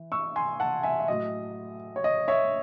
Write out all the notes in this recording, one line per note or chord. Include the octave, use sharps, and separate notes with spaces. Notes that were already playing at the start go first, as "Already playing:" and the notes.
Already playing: E3
C#6 E6
G#5 C6
F#5 A5
E5 G#5
E5
A2 F#3 D#5
C#5
D#5
C#5 E5